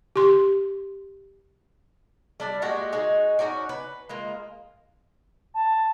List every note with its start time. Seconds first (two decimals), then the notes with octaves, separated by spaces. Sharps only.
0.16 G4 C6
2.40 G3 D4 D5
2.62 A#2 G#3 F#4 G4
2.92 G#3 D#4 F#4
3.39 C#4 D#4 F#4 D5
3.69 B4
4.09 G#3 A#3 F4
5.54 A5